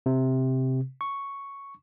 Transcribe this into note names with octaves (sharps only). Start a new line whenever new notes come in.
C3
C#6